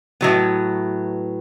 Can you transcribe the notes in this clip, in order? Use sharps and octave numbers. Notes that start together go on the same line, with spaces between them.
A2 F#3 B3